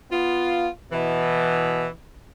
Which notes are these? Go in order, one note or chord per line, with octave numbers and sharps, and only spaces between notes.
B3 F4
B2 E3